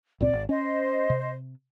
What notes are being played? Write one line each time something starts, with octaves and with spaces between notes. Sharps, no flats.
C#2 A#2 C4 D5
G#1
C#4 C5 D#5
C3